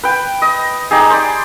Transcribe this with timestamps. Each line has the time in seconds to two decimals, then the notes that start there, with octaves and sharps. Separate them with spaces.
0.03 B4 G5
0.42 D#5
0.91 D#4 G4 G#4
1.10 C5 D5